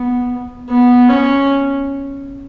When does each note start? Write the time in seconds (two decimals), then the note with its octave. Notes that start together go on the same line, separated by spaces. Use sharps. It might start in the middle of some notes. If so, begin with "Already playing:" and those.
Already playing: B3
0.70 B3
1.09 C#4